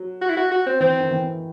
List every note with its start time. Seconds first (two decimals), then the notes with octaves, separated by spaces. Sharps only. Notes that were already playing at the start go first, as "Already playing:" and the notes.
Already playing: F#3
0.22 F#4
0.30 E4
0.37 F#4
0.51 F#4
0.67 C4
0.80 E3 C4
0.99 D#3
1.11 E3